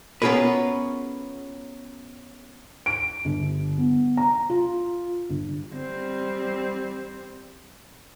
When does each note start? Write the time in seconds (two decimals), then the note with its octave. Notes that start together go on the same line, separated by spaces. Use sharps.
0.22 B3 C#4 F4 G#4 A#4 B4
2.86 D7
3.25 G1
3.78 B3
4.17 A#5
4.50 F4
5.30 G1
5.72 G3 C4